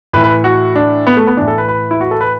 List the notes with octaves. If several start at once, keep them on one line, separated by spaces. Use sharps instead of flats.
A2 E3 B4
B4
F#4
D4
B3
A3
B3
A2 E3 D4
A4
B4
B4
E4
F#4
A4
B4